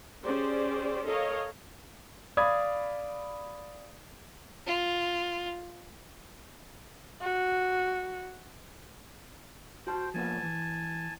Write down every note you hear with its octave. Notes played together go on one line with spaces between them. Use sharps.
C#4 G4 G#4 C5 D5
A4 A#4 C#5 D#5 F5
D5 F5 B5 D#6 G#6
F4
F#4
F#4 C5 G5 A5
F3 A#3 B3 G#5 A5
E3